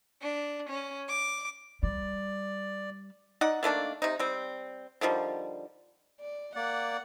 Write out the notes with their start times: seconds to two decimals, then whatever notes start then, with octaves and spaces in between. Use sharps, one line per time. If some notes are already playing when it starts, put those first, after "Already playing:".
0.22 D4
0.70 C#4
1.08 D6
1.83 G3 D5
3.41 D#4 D5 F#5
3.63 D#3 A3 A#3 D4
4.02 C3 D#4
4.19 G3 C4
5.01 D3 D#3 F3 G3
6.20 D5
6.56 A#3 D5 F#5